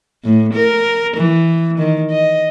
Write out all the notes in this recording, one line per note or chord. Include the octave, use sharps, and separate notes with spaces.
A2
A#4
E3
D#3
D#5